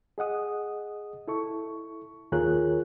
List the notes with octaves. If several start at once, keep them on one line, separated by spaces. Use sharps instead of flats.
G#4 D#5 F#5 D#6
E4 A4 C#6
D#2 F4 G#4 A#4 C#5 F#6